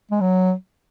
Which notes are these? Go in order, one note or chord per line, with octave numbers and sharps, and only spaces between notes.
G#3
F#3